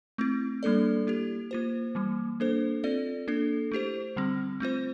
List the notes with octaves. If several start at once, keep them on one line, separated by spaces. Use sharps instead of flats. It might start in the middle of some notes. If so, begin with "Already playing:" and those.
A3 C4 E4
G3 A#3 D4 A4 D5
A#3 E4 G4
A#3 F4 C5
E3 G3 A#3
A#3 D4 A4 C5
C4 F4 A4 D5
A#3 D4 A4
A3 E4 G4 C5
D3 G3 C4
A3 C4 F4 C5